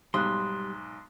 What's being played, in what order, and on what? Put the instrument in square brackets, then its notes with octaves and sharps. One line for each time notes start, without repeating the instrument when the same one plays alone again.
[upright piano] B1 G#2 [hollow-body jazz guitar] G3 [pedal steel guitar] C6 [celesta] D#6 F#6